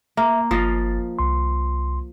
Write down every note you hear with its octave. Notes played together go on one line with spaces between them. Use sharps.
A#3 E5
G1 F3 D#5 F5 A6
C2 C6